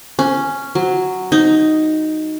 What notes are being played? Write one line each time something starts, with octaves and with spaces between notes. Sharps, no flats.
C#4
F#3
D#4